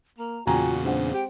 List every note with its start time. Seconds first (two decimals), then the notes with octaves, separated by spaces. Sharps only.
0.18 A#3 A#5
0.47 E2 A#2 C#3 F4 F#4 G5 G#5 A#5
0.84 G#3 C4 D4 F#5
1.14 G4 G5